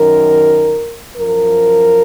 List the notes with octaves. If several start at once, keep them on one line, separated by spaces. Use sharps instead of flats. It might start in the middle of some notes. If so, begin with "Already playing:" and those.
Already playing: F#2 D#3 A#4
F#2 F3 A#4